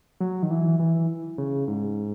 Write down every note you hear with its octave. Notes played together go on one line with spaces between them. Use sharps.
F#3
D#3
E3
E3
C#3
G#2